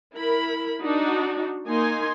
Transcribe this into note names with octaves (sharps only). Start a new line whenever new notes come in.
E4 A#4 B5
D4 D#4 F#4
A#3 D#4 G#5 C6